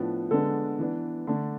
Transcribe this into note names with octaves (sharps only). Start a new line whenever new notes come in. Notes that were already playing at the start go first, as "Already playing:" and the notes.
Already playing: A2 F3 B3 D4
D3 G#3 B3 D4 A4
E3 B3 D4
D3 A3 D4